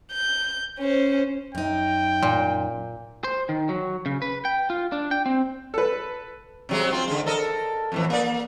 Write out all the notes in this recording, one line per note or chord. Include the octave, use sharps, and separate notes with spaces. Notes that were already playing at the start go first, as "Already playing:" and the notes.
G6
C#4 C5
F#2 D#4 G5
A#2
C5
D#3
F#3
C#3
B4
G5
F4
D4
G5
C4
A4 B4
C3 F#3 G#3
C4 F4
D3 G#3
A4 A#4 D#5
F2 A2 E3
A#3 D5